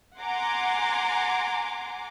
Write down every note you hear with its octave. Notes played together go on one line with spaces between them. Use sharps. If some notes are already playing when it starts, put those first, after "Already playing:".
F#5 G#5 A#5 C6 D6